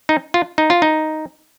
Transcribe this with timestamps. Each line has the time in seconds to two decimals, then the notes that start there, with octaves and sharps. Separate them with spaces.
0.09 D#4
0.34 F4
0.58 D#4
0.70 F4
0.82 D#4